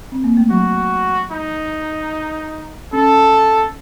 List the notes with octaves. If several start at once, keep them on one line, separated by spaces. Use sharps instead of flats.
C4
A#3
A3
F#3 F#4
D#4
C#4 A4